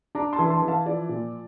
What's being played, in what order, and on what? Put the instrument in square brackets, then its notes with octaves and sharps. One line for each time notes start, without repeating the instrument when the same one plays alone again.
[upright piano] D4 A#5 D6
A5 C6
E3
A5 C6
E3
F5 A5
F3 D5
A#2